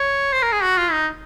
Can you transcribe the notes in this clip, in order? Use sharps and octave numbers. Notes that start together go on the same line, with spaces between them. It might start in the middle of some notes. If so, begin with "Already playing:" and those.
Already playing: C#5
C5
A#4
G#4
F#4
F4
D#4